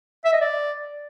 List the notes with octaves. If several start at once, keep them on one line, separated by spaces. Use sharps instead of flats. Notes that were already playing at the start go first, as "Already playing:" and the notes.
E5
D#5
D5